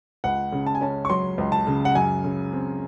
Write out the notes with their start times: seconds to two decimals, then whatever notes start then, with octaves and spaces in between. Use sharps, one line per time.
0.24 C#2 F#5
0.52 C#3
0.66 A5
0.75 G#5
0.81 C#4 A5
1.05 C#6
1.10 F#3 C6
1.38 C#2
1.52 A5
1.67 C#3
1.85 F#5
1.95 F#2 G#5
2.24 C#3
2.52 C4